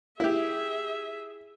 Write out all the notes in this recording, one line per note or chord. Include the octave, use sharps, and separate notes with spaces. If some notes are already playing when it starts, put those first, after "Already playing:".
E4 G4 G#4 E5